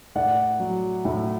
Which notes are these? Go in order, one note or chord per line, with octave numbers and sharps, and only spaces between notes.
A2 D5 F#5
F#3
A2